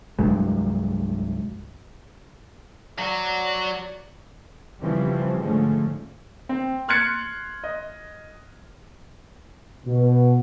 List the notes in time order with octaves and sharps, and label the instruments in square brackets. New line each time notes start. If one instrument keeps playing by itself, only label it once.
[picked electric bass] C2 G2 F#3 G#3
[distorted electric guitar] F#3 F#4 [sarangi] D5
[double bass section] C#3 E3 F3 G3 C4 C#4
G#2 D3 F3 G#3 A3 C#4
[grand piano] C4
C6 F6 F#6 G#6 A6 C#7
D#5
[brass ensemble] B2